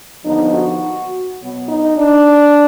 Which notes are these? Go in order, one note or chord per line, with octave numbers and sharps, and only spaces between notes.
D#2 D3 F3 B3 D#4
F#4
B2 F#3 B3
D#4
D4